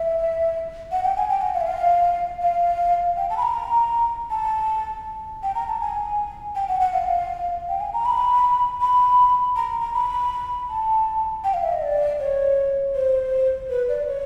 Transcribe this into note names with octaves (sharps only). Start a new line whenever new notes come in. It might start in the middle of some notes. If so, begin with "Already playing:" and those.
Already playing: E5
F#5
G5
G#5
G5
F#5
F5
E5
F5
F5
G5
A5
B5
A#5
A5
G5
A#5
A5
G#5
G5
F#5
F#5
F5
G5
G#5
A#5
B5
B5
A#5
A#5
B5
A5
G5
F5
E5
D#5
D5
C#5
C5
B4
D5
C#5